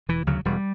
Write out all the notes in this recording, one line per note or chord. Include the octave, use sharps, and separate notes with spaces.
E1 E3
D2 C#3 F#3
E1 G3